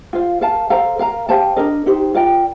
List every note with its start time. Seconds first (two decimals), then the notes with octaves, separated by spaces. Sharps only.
0.13 F4 C5 F5
0.41 A#4 F5 A5
0.70 A4 C5 F5 A#5
0.99 A#4 F5 A#5
1.29 G4 C5 F5 A5
1.57 D4 F4 A#4 D#5
1.86 D#4 G4 C5
2.14 F4 A#4 D5 G5